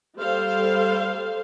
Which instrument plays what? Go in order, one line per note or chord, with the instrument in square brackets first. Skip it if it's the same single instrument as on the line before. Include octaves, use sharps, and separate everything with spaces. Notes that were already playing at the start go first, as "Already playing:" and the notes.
[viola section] G3 A4 C5 F5